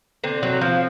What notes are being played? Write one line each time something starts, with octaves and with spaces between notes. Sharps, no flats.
D3 C4
F#3
F3